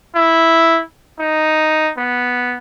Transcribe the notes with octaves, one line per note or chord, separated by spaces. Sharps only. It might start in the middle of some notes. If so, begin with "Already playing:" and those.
E4
D#4
B3